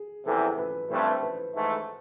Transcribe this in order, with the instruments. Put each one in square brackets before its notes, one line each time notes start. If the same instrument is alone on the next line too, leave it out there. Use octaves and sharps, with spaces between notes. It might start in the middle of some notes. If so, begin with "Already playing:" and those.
Already playing: [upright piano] G#4
[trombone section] E2 C3 E3 [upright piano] A4
[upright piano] B4
[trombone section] G2 E3 A3 C4 [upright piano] C5
[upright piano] B4
[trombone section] G#2 E3 A3